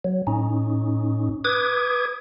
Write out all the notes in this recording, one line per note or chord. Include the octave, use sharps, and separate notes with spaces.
F#3
A2 C#4 D#4
B4 D6 D#6 G#6